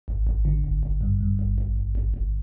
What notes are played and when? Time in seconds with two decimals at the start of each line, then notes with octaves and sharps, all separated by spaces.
0.08 G#1
0.27 G#1
0.45 D3
0.64 G#1
0.83 G#1
1.01 G2
1.20 G2
1.39 G#1
1.58 G#1
1.76 G#1
1.95 G#1
2.14 G#1